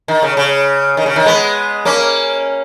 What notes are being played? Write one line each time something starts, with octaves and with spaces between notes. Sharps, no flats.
D#3
C#3
C#3
D#3
C#3
D#3
G#3 B3
A#3 C#4